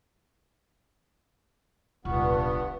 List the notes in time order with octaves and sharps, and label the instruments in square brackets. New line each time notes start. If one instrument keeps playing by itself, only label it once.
[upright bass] D#1 C2 [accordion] G2 B3 [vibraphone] F4 F#5 C#6